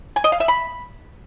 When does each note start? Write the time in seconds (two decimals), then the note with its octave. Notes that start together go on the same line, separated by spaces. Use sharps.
0.16 G#5
0.24 D#5
0.32 F5
0.40 E5
0.48 B5